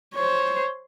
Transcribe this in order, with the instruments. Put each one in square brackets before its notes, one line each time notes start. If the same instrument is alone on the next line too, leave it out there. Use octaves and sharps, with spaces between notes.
[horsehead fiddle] C5 C#5